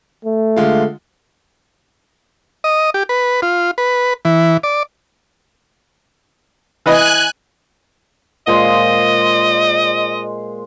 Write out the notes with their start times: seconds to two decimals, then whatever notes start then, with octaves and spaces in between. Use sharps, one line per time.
0.25 A3
0.56 D3 G#3 F4
2.64 D#5
2.94 G4
3.09 B4
3.42 F4
3.78 B4
4.25 E3
4.63 D5
6.86 E3 B4 D#5 G#5 F#6
8.47 A#2 G#3 C5 D#5